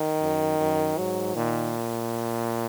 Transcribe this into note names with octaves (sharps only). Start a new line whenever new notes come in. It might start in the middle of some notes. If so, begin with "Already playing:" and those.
Already playing: D#3
F#2
F#2
G#2 F#3
A#2 D#3